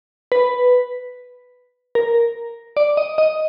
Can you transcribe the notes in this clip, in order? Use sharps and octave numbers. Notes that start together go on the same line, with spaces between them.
B4
A#4
D5
D#5
D#5